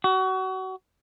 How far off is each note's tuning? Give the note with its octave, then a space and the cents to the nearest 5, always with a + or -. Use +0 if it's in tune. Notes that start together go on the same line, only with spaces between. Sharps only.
F#4 +30